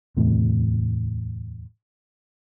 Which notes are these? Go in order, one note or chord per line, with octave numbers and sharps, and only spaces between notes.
D1 E2 A2 C3